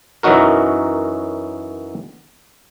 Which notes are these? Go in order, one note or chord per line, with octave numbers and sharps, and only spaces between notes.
F#2 E3 F#3 D#4 F#4 A#4